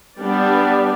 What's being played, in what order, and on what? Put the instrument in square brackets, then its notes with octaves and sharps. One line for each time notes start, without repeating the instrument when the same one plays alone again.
[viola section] G3 B3 D4 G4 D5